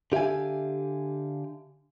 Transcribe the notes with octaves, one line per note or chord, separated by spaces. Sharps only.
D3 G4 E5 F5 G#5